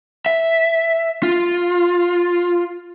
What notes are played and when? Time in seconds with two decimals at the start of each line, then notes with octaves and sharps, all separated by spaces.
0.26 E5
1.23 F4